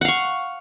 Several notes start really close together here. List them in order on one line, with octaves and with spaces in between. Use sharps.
F#5 F5 C#6